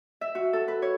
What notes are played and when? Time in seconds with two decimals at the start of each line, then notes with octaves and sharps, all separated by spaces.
0.21 E5
0.35 F#4
0.53 A4
0.68 B4
0.82 C#5